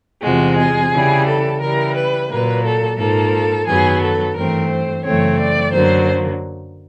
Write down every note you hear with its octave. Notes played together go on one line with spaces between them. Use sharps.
E2 C3 F3 G#3 F#4
G#4
C#3 E3 G3
A4
C#3 E3 G3 A#4
B4
A#2 F#3 A#3 B4
A4
G#2 F3 A#3 A4
F#2 D#3 F#3 B3 G#4
A4
G2 E3 A3 C4 A#4
C5
F#2 C#3 E3 A3 C4 C#5
D5
F#2 D3 F#3 A#3 C5